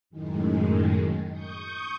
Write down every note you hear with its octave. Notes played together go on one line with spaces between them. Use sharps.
F#2 A2 D#3 G#3
C#6 D#6 G6